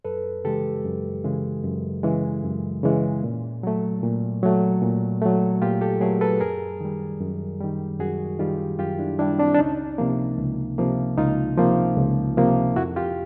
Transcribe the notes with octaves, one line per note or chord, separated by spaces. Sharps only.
F#2 A4 B4
C#3 E3 G#3 G4 A4
F#2
C#3 E3 G#3
F#2
C#3 E3 G#3
F#2
C#3 E3 G#3
A#2
F#3 A3
A#2
F#3 A3
A#2
F#3 A3
A#2 F4 G4
G4 A4
F#3 A3 G#4 A#4
A4 B4
F#2 G#4 A#4
D#3 G3
F#2
D#3 G3
F#2 F#4 G#4
D#3 G3 F4 G4
F#2 F4 G4
D4 E4
D#3 G3 D4 E4
C4 D4
D4
C#2 C#4 D#4
C3 F3 A#3
C#2
C3 F3 A#3
C#2 D#4 F4
C3 F3 A#3
C#2
C3 F3 A#3
F2 E4 F#4
F4 G4